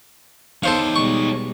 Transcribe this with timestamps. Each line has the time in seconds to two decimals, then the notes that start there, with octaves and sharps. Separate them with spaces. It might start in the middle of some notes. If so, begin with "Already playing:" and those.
0.63 E2 D#4 A4 C5 C#5 F5
0.96 B2 G3 G#3 C#6